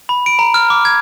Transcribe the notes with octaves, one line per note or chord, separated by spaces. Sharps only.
B5
D7
A#5
F6
D6
G#6